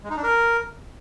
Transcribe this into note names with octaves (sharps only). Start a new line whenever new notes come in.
G#3
D#4
D4
A#4